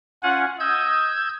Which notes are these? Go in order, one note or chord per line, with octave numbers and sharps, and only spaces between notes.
C#4 F4 F#5 G#5
D#5 E6 G6 G#6